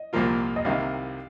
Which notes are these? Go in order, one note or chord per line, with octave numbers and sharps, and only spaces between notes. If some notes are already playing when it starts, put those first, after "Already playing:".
Already playing: D#5
C2 A#2 F3 A#3 F4
D#5
C2 C3 D#3 F5